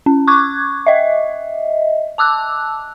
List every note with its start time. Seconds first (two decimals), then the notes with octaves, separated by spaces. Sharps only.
0.06 C#4
0.27 C#6 D6 F#6 G#6
0.86 D#5 E5
2.18 A5 D6 E6 F#6